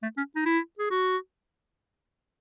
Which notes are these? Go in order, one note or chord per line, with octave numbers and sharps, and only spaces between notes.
A3
C#4
D#4
E4
G#4
F#4